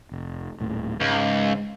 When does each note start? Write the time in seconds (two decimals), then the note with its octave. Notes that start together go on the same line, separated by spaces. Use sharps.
0.11 F1
0.61 D#1 A2
1.00 C#2 G#2